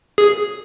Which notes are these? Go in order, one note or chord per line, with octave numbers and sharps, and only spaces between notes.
G#4